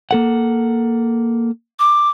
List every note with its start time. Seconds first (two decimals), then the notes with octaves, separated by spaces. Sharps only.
0.11 A#3 A4 F#5
1.79 D6